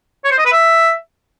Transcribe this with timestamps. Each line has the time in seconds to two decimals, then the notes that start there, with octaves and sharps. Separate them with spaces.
0.24 C#5
0.31 C5
0.38 D#5
0.45 B4
0.52 E5